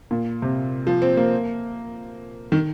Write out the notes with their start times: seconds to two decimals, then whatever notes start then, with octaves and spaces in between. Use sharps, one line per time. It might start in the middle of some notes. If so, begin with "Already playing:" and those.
0.11 A#2
0.42 C3
0.87 F3
1.02 C4
1.17 A#3
2.52 D#3